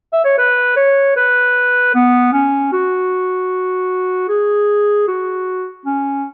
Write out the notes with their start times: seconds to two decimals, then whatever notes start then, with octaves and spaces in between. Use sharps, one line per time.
0.13 E5
0.25 C#5
0.38 B4
0.76 C#5
1.16 B4
1.95 B3
2.33 C#4
2.73 F#4
4.29 G#4
5.08 F#4
5.86 C#4